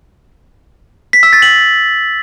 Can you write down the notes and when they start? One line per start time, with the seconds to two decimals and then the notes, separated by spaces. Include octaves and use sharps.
1.13 B6
1.23 E6
1.33 A6
1.42 F#7